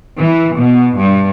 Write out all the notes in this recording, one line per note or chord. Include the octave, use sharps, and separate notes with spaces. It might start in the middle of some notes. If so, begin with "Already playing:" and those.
E3
B2
G2